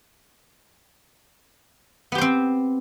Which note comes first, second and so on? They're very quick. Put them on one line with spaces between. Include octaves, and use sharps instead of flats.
B3 G4 C5 C4